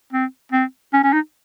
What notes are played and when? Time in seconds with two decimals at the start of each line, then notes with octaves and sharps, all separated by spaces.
0.13 C4
0.52 C4
0.93 C#4
1.03 C#4
1.13 D#4